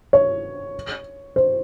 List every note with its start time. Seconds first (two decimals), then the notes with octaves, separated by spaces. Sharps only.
0.13 C#5
1.36 C5